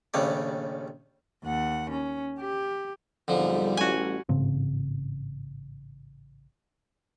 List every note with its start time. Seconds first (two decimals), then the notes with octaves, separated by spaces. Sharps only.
0.14 A#1 D#2 C#3 G3 A3 D5
1.44 D#2 F#5
1.90 C#4
2.40 G4
3.28 B1 F2 G#2 D3 F3 G3
3.77 A1 F#4 G#5
4.29 A1 G#2 C#3 C4